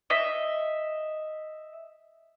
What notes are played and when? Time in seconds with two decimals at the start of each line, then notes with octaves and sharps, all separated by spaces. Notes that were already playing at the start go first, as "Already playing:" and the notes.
0.10 D#5 E5